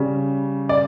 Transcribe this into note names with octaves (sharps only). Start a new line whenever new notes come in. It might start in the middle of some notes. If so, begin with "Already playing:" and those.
Already playing: C#3 G3
D5